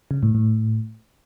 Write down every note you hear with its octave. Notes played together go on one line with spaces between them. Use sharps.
C#3
A2
A2